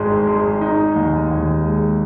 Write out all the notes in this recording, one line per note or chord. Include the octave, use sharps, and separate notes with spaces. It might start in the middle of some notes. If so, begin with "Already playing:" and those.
Already playing: G#1 G#2 G#3
G#3
D#4
D#2
D#2
G#3